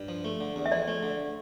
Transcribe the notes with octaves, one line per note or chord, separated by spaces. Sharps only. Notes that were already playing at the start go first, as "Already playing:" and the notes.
Already playing: G2
F3
A3
D3
E2
E5
F3 D5
A3
D3